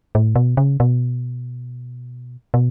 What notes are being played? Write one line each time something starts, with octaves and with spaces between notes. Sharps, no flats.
A2
B2
C#3
B2
B2